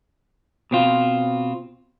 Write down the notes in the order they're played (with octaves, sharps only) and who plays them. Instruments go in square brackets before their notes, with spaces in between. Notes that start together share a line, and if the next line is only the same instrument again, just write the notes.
[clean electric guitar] B2 C4 F4